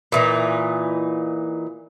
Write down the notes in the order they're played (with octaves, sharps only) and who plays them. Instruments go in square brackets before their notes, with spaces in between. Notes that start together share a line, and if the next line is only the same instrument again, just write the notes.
[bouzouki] A#2 E3 D#4